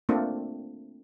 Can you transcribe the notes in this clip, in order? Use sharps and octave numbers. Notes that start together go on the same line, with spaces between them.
A3 A#3 C4 D4 F4